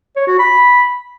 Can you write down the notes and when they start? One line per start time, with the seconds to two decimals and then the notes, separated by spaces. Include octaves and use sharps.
0.16 C#5
0.27 F#4
0.39 B5